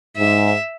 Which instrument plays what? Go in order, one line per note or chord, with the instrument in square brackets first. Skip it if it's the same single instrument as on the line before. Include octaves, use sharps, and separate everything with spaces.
[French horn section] G#2 [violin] E5